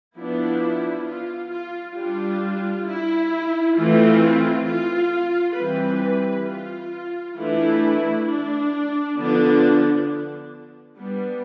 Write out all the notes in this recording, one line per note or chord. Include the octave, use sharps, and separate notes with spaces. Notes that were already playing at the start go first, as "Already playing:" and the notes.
F3 B3 D4 E4
F4
F4
G3 D4 F4
E4
E3 A3 C4 F4
F4
E3 G3 C4 B4
F4
E3 A3 D4 E4
D4
D3 F3 B3 D4
G3 B3 D4